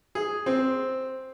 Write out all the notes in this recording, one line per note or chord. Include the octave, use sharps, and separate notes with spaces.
G#4
C4